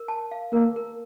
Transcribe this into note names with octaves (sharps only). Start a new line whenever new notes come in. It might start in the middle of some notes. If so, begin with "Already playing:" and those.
Already playing: A#4
A5
F5
A#3 A#4
A#4